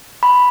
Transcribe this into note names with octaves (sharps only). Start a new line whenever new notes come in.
B5